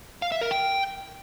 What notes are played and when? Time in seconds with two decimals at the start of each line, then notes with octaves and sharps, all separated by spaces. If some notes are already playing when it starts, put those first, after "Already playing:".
0.22 F5
0.32 E5
0.41 A#4
0.51 G5